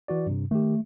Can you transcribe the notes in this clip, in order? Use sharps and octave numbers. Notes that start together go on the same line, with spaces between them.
E3 F#4 D5
G2 C3
D#3 A3 G4